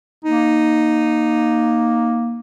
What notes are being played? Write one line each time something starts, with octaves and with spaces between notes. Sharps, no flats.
A#3 D#4